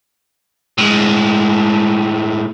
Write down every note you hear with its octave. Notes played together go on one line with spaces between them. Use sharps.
A2 G#3